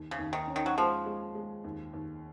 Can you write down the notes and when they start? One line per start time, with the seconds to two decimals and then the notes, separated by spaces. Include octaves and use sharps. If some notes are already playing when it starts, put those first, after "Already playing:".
Already playing: D#2
0.11 C#3
0.18 D#2
0.33 D#3
0.47 C#4
0.56 D#3
0.66 F#3
0.77 F3 G#3
1.06 G#3
1.35 G#3
1.64 D#2
1.93 D#2